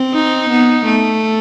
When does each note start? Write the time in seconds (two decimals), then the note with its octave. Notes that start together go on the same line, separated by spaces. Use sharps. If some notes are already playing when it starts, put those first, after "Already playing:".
Already playing: C4
0.14 D#4
0.50 B3
0.85 A3